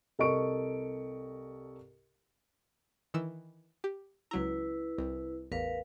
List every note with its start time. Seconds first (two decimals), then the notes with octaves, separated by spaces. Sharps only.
0.19 C2 A4 A#4 D#5 C#6 D7
3.14 D#3 E3 E6
3.84 G4
4.31 C#2 F#3 E4 B4 A#5
4.98 C2
5.52 A1 E2 A#4 B4 F5